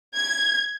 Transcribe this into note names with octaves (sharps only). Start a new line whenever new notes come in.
G#6